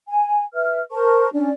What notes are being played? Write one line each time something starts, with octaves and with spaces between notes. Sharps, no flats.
G#5
B4 E5 F6
A#4 C5 A5 C#6
C#4 D4 D5